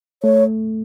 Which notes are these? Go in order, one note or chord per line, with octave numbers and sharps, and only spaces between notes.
A3 C#5